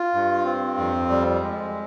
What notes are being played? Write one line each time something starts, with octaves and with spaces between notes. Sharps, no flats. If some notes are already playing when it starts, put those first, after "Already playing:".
Already playing: F4
G2
C4
F2
G3
G#3